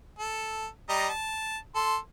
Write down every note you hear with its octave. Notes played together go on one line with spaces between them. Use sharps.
A4
G3 D#5 A#5
A5
A4 C6